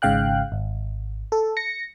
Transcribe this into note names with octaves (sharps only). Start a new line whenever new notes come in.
G#1 G#2 C#3 F5 G5 F#6
G#1
A4
A#6 C#7